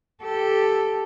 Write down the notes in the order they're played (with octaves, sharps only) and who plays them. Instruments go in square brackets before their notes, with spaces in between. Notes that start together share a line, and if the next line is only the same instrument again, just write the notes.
[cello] G4 A4